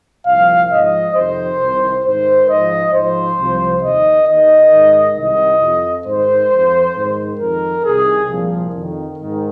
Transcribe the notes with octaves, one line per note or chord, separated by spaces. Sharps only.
C2 A#2 F3 F5
G#2 F3 D#5
F2 C3 D#3 C5
C2 C3 D#3
G#2 D#3 C5
G#2 F3 D#5
G#2 F3 C5
C2 C3 F3
D#2 D#3 D#5
D#2 D#3 D#5
G#2 D#3
C2 C3 D#3 D#5
F2 F3
G#2 D#3 C5
F3
F2
G#2 D#3
F2 D#3 A#4
C2 C3 D#3 G#4
C2 A#2 F3
F2 D#3
G#2 D#3